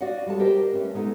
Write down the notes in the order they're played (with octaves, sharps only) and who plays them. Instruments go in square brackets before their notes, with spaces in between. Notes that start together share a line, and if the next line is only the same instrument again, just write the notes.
[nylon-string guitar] F#4 D5 D#5 F5 F#5
G3 G#3 A4 A5
G4 A#4 C5 D#5
A3 C#4 B4
G#3 B3 D#4 A4